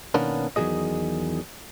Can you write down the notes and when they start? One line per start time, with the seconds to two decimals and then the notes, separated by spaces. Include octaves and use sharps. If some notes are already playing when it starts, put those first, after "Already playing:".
0.14 B2 D#3 A#3 B3 C#4 D4
0.56 E2 D#3 F3 F#3 G#4 D#5